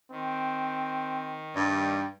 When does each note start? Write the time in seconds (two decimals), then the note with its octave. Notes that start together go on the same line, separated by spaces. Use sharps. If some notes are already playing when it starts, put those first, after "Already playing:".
0.12 D#3 C4
1.56 G2 G3